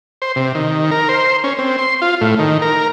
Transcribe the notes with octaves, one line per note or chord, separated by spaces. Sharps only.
C5
C3
D#3
A#4
C5
C#4
C4
C6
F4
A2
D#3
A#4